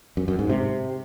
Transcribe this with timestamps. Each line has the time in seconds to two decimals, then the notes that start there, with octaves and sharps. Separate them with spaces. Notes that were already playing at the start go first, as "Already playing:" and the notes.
0.17 F#2
0.28 F#2
0.39 G#2
0.50 C3